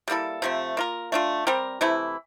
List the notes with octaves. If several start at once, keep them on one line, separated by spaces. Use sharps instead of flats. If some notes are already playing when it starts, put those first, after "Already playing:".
G3 A#3 E4 A4
C3 F3 A3 C4
A#3 F4 A#4
A3 D4 F4
G3 C4 G4 A#4
C3 E3 A3 E4